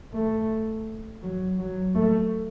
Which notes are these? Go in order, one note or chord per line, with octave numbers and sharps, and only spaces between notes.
A3
F#3
F#3
A3